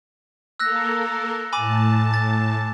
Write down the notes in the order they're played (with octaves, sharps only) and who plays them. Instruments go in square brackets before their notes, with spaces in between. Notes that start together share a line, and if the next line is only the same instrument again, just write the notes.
[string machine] A#3 A4 A#4 [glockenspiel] E6 F#6 A#6
[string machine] A2 A5 [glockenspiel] G#5 B5 D6
[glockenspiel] A6